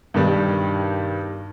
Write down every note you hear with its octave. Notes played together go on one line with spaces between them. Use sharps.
G2 B2 D#3 G3